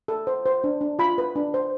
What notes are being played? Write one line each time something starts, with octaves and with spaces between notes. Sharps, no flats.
A4
C5
C5
D4
D4
F4 B5
B4
D4
C5